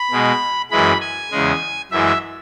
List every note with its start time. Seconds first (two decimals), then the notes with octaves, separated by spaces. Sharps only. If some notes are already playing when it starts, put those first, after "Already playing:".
Already playing: B5
0.11 B2 G#3
0.71 F#2 E3 G#3 B5
1.01 G#5
1.31 E2 C#3 G#3
1.91 F#2 E3 G#3 E5